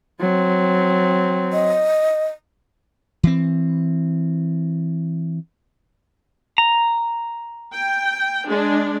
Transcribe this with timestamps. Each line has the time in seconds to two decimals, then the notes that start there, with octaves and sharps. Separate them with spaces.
0.20 F#3 C4
1.53 D#5
3.23 E3 C4
6.58 A#5
7.73 G5
8.48 G#3 D4